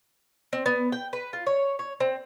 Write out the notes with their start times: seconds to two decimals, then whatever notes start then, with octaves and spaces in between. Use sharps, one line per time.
0.53 C4
0.66 B3
0.92 G5
1.13 B4
1.33 F4
1.47 C#5
1.79 C#5
2.00 C4